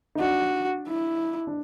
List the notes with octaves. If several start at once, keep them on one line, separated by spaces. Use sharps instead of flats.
D#4
D4 F#4
E4
D4